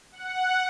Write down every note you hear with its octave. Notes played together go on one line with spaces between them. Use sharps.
F#5